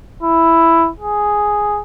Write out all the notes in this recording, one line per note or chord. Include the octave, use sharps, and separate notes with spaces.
E4
G#4